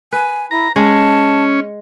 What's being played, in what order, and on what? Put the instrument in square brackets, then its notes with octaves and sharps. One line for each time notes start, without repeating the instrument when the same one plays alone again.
[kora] B4 [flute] G#5
[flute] E4 [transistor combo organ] A#5
[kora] G#3 [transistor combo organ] C#4 [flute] A5